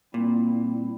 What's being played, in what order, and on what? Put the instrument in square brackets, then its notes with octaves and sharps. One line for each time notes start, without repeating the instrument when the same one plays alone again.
[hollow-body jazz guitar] A#2 [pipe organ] G3 C4 E4